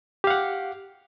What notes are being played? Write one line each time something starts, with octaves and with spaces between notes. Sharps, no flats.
G4 F5 F#5